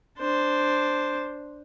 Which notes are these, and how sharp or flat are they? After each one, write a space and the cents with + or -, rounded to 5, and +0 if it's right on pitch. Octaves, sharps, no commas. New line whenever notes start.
D4 +0 C5 +0